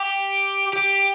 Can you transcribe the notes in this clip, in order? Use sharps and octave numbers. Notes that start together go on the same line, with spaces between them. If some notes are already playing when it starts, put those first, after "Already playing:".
Already playing: G4
G4